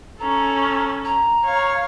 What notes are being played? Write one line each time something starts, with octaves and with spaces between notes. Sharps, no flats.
C#4 A4 A#5
A#5
C#5 F5